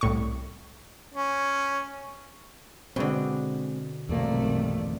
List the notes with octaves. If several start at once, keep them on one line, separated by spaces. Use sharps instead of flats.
C2 A2 C#6
C#4
B2 D3 G#3 C4
B1 E2 G2 C3 D#3 A3 A#3 D5